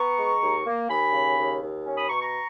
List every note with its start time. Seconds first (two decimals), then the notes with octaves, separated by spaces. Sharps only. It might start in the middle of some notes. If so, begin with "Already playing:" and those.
Already playing: B3 A#5 C#6
0.17 G#3
0.41 D#2
0.65 A#3
0.88 D#2 G#5 B5
1.13 C#3
1.38 D#2
1.61 D#2
1.86 C#4
1.97 B5 D#6
2.09 B2 A#5 C#6
2.21 A#5 C#6